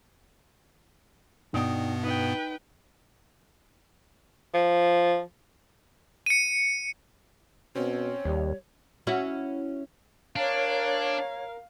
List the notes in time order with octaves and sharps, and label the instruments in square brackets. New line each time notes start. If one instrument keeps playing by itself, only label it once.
[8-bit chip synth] G2 B2 B3 [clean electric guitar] D#4 D5 G5
[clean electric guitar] D#4 [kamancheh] B4 G5
[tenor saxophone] F3
[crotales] C#7 D#7
[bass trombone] B2 [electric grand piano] C4 C#4 [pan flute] C#5
[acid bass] D#2 [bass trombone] G3
[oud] C#4 E4 F#4
[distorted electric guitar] D4 [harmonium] A#4 [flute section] C#5 [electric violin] F5